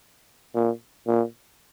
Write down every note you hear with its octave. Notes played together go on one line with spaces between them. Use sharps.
A#2
A#2